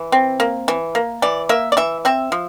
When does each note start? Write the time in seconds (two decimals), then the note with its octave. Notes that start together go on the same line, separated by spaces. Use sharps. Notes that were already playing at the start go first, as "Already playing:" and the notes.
Already playing: E3
0.12 C4
0.40 A#3
0.68 E3
0.95 A#3
1.22 E3 D5
1.49 A#3 E5
1.72 D5
1.77 E3 E5
2.05 C4 E5
2.32 F3